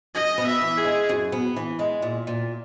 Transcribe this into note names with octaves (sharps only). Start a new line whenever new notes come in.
F#2 D#5
B3
E5
E3
G#4
G#3
F#2
B3
E3
G#3
A#2
A#2